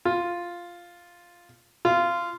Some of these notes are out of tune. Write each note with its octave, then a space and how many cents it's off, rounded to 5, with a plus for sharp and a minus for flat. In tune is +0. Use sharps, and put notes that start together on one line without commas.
F4 -5
F4 -20